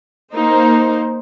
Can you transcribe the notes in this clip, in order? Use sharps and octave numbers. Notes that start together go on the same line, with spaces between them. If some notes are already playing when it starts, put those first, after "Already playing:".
A#3 D#4 C5